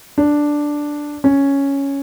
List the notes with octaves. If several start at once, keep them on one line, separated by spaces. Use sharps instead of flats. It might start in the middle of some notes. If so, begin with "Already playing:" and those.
D4
C#4